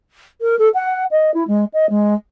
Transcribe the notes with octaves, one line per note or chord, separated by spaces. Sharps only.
A#4
A4
F#5
D#5
E4
G#3
D#5
G#3